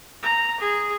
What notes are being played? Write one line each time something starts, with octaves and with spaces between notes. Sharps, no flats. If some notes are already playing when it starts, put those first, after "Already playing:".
A#5
G#4